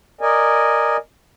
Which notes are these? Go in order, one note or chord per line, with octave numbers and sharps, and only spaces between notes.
A#4 D5 D#5 G#5